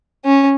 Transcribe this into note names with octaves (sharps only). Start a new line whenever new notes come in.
C#4